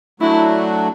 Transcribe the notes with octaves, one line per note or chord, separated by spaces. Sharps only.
F#3 A3 D4 E4 F#4